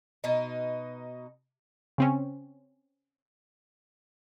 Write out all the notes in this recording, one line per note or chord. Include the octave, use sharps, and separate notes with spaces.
B2 D#4
C#3 C4 C#4